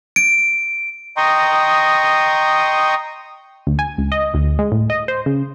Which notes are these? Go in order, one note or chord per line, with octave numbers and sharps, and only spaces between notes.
D7
D#5 G5 A#5 C6 C#6 D#6
D2
G#5
C#2
D#5
D2
G#3
A2
D#5
C5
C#3